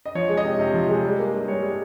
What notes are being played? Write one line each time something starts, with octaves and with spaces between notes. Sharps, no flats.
D#5
F3 C#5
G#3
D#5
C3
C3
F3
G#3
G3
A#3
G2
G2 C#5
G3